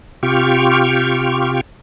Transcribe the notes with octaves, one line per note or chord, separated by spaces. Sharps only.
C3 F4 G4 G5 C#6 F6